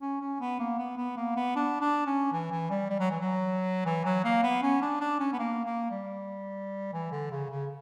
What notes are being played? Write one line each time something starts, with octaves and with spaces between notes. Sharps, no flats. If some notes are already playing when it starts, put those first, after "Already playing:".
C#4
C#4
B3
A#3
B3
B3
A#3
B3
D4
D4
C#4
E3
E3
G3
G3
F#3
E3
F#3
E3
F#3
A#3
B3
C#4
D4
D4
C#4
B3
A#3
A#3
G3
E3
D3
C#3
C#3